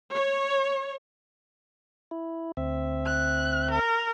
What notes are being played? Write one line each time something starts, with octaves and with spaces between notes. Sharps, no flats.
C#5
E4
D2 C4 E5
F#6
A#4